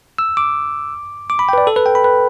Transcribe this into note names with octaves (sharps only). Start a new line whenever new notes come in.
E6
D6
D6
B5
G5
B4
D5
A4
B4
G5
B5
B4